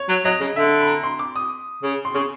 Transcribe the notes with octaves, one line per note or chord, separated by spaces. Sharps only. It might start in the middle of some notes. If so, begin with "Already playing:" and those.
Already playing: C#5
F#3
F#3 D#5
C#3
D3 E5
B5
A#5
C6
D6
D#6
C#3
C6
C#3 C#6